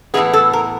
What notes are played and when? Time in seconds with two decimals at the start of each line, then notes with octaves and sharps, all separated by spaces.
0.14 A2 E3 G#3 B3 G#4
0.33 A4
0.53 A#4